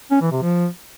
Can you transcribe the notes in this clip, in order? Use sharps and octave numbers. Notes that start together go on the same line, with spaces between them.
C#4
E3
C3
F3